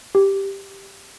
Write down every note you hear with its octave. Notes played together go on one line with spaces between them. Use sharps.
G4